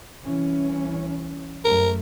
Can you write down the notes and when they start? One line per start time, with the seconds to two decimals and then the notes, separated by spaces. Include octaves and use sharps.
0.21 C2 E3 C#4
1.65 F#2 A3 A#4